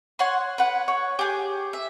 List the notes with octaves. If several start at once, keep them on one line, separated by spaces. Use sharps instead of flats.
C#5 F#5 C6
B4 F#5
C#5
G4 G#4
E5